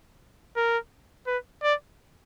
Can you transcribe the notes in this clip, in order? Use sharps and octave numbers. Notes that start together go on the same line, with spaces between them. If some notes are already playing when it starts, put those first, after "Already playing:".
A#4
B4
D5